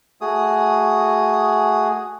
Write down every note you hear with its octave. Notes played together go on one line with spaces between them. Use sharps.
A3 F#4 G#4 D#6